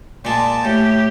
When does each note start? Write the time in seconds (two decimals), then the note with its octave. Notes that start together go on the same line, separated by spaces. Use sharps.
0.25 A#2 G#3 D5 A5
0.65 A2 G4